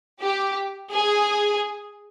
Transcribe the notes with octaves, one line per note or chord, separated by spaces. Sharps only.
G4
G#4